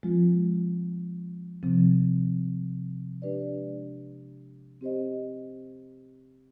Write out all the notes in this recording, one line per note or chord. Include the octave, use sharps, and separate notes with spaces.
F3 G#3 C4 F4
C3 F3 C4
G#3 D4 G4 B4 D5
C4 G4 C5 D#5